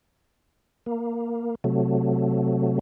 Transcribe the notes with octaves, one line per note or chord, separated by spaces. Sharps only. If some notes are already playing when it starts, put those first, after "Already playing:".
A#3
C3 F#3 A3